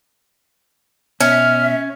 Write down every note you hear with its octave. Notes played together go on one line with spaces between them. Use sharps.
B2 C#4 E5 F6